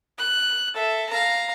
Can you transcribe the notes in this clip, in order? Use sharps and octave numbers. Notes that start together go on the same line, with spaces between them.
F#6
A4 E5
F5 A#5